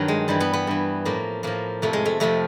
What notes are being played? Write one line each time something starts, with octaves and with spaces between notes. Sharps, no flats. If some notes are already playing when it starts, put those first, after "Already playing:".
Already playing: G2 D#3 F#3
G#3
G2 E3 G3
B3
B3
G2 E3
A2 F3 A#3
A2 F3 A#3
F2 C3 F3 A3
G#3
A3
F2 C3 F3 A3